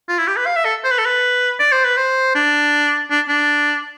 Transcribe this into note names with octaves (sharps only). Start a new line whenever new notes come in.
F4
E4
G4
B4
F5
E5
A4
C5
B4
A4
B4
D5
C5
B4
C5
D4
D4
D4